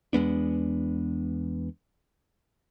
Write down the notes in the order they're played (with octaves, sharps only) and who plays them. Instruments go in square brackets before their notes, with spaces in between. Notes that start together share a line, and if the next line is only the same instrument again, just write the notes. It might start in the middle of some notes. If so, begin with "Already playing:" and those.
[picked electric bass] E2 G#3 B3 D4